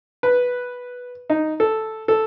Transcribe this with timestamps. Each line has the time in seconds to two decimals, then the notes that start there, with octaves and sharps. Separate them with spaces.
0.23 B4
1.30 D#4
1.60 A4
2.08 A4